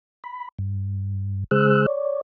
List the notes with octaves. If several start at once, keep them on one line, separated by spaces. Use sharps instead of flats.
B5
G2
C#3 G#3 G#4 C5 E6 F#6
C#5 D5